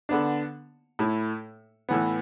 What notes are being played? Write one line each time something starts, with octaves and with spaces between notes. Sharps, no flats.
D3 B3 D4
A2 A3 E4
A2 E3 B3